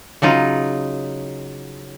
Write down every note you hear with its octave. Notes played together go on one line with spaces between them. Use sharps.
C#3 F#3 D#4 F4